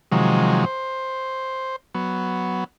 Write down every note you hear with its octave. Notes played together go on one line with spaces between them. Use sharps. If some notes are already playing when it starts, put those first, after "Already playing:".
C3 D#3 F3 F#3 G#3
C5
F#3 B3